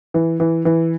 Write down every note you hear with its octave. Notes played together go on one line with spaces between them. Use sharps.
E3
E3
E3